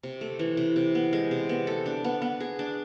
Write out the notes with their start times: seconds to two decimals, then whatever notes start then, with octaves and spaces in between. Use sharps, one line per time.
0.03 C3
0.21 A3
0.39 E3
0.57 C3
0.76 C3
0.95 B3
1.13 G#3
1.31 C3
1.49 B3
1.67 A4
1.86 D4
2.04 B3
2.22 B3
2.40 G#4
2.59 D4